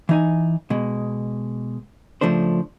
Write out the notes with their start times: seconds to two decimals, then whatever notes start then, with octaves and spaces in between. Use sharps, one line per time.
0.09 E3 D#4 G#5
0.70 B2 G#3
2.21 C#3 F3 A3 D4 C5